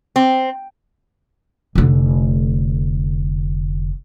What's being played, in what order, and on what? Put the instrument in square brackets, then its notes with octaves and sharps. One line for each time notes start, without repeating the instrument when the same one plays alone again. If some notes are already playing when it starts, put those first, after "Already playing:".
[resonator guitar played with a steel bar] C4
[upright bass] F1 D3